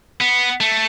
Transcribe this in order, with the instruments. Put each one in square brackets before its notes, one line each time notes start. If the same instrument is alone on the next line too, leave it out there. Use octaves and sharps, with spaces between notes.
[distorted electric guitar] B3
A3